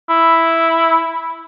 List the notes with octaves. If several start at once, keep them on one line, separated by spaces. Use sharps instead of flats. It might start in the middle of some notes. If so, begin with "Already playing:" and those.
E4